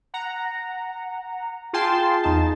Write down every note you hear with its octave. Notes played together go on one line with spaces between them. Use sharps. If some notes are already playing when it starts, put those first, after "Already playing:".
F#5 A#5
F4 G#4 G5 A5 C6
E2 D#4 A5